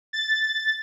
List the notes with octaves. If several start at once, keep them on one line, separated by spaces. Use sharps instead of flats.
A6